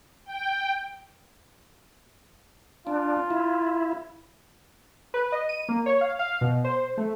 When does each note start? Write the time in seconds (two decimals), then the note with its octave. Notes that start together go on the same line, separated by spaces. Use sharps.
0.25 G5
2.87 D4 F4
3.31 E4
5.14 B4
5.32 D#5
5.49 D#7
5.69 A#3
5.86 C#5
6.01 F5
6.19 F5
6.41 B2
6.64 C5
6.97 A3